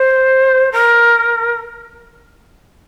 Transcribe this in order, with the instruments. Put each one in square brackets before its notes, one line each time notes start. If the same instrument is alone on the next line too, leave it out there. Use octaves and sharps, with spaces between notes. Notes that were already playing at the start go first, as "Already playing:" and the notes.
Already playing: [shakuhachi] C5
A#4